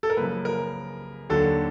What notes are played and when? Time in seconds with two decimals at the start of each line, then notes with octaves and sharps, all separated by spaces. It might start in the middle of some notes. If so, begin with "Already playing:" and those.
0.03 A4
0.10 A#4
0.17 F#2 C#3 F3 A#3 B4
0.45 A#4
1.29 D#2 D3 F#3 A4